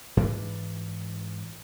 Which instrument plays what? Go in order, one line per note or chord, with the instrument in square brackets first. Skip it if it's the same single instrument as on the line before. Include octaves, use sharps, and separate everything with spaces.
[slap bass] G#2 E3 D4